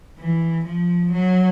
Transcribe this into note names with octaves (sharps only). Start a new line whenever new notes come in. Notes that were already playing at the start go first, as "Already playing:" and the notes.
E3
F3
F#3